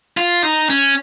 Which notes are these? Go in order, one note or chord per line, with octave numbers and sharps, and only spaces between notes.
F4
D#4
C#4